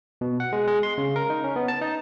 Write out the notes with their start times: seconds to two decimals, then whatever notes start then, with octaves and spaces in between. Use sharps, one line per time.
0.21 B2
0.40 F#5
0.53 G#3
0.68 G#3
0.83 C6
0.98 C#3
1.16 A#4
1.30 D#4
1.44 C#4
1.56 B3
1.68 A5
1.82 D#4